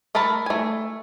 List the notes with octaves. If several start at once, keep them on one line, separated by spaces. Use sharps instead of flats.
A3 A#4 A5 B5
A3 G#5